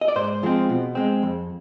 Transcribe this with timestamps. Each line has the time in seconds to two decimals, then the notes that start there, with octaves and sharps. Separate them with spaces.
0.01 D#5
0.08 D5
0.16 G#2 C5
0.43 F3 G#3 C4
0.69 B2
0.95 G#3 C4
1.22 F2